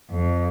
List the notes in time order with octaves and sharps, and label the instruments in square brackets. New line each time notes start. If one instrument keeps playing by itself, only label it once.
[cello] F2